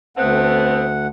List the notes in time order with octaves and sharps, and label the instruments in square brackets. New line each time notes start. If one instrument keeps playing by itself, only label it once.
[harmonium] D2 F#5 [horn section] A3 B3 C4